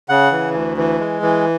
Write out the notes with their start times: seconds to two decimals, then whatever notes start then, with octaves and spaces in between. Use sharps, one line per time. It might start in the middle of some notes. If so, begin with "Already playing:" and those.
0.09 C#3 F#5
0.32 E3
0.54 D2
0.77 E3
1.00 G#3
1.22 E3